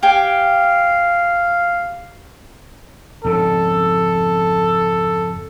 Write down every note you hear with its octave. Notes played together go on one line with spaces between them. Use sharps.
G4 F5 G5 G#5
F2 G#2 C#3 A4